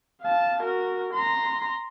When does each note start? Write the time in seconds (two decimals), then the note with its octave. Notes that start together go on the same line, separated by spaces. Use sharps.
0.22 F5 A5
0.62 F#4 A#4
1.13 A#5 C6